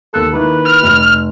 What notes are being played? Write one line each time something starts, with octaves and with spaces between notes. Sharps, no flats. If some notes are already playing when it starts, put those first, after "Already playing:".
D#2 A4 F#6
D#3 A#3 E4 B4
F6
F1